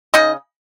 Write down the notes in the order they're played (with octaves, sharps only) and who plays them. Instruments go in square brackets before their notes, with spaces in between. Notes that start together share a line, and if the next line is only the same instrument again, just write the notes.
[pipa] C#3 D#4 D#5